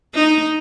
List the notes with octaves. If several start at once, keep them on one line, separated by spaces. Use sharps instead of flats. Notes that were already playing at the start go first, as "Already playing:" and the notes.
D#4